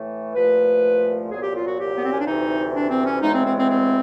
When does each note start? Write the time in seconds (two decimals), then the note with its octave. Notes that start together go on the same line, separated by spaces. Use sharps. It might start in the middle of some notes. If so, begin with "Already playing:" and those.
Already playing: A2 E3 A3
0.34 C2 A#2 F3 A3 B4
1.30 C2 A#2 F#3 B3 G#4
1.42 G4
1.55 F4
1.66 F#4
1.78 G4
1.97 B3
2.05 C4
2.12 C#4
2.19 D4
2.26 D2 C3 E3 D#4
2.73 D4
2.90 C4
3.06 C#4
3.22 D2 C#3 E3 G#3 B3 D#4
3.34 C4
3.46 C4
3.57 C4
3.69 C4